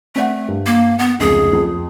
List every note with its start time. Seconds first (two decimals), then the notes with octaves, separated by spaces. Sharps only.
0.16 A3 C4 D5 F#5
0.48 G2
0.66 A#3
0.99 B3 F#5
1.20 F1 C#2 G#4
1.53 F2